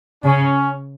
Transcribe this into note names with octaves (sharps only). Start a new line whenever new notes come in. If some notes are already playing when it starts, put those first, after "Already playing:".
C#3 C#4